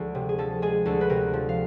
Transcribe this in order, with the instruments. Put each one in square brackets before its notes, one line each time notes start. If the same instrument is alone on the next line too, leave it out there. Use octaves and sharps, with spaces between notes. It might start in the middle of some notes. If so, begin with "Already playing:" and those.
Already playing: [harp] D2 F3 G#3 A4
C3
G#4
F3 A4
G#3 G#4
D2 A4
B4
C3 A#4
F3
F5